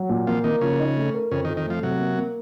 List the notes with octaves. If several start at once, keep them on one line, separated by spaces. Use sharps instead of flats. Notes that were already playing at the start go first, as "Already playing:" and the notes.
Already playing: F#3
A#2
F3 A#3
D#3 A#3
C#3 F3
D#4
A3
A#4
F2 C#3
D#3
F2
D#3
F3 A3
C3 F#3
A#3
A#3